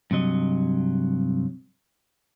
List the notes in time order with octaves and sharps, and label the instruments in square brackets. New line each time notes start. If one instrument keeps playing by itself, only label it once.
[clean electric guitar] G2 C3 F#3 D#5